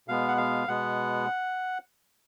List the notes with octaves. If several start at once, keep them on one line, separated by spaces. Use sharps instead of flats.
B2 G#3 B3 F5
F#5
F5
B2 G#3 B3 F#5